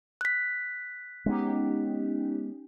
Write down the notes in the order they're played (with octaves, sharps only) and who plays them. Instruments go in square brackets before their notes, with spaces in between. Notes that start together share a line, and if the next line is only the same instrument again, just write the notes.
[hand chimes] F#6 B6
[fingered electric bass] G#3 B3 [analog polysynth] C#4 D#4 G4